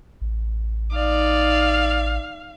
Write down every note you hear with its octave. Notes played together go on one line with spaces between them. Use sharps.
A1
D#4 D5 F5